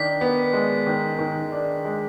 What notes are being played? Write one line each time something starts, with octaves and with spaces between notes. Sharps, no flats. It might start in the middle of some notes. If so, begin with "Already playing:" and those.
Already playing: D#3 D4 B6
B3
G#3
D#3
D#3
D4
G#3